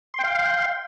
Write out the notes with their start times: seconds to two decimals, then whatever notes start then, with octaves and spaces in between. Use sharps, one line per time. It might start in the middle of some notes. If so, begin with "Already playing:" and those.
0.14 C6
0.19 G5
0.24 F5